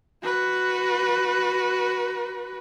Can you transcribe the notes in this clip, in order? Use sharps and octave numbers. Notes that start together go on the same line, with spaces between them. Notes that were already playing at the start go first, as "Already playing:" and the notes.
F#4 B4